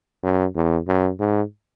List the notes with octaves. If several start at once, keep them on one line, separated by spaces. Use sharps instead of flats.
F#2
E2
F#2
G#2